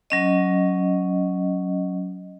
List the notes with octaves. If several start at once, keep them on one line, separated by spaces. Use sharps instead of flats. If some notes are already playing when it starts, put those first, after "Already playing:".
F#3 C#4 D#5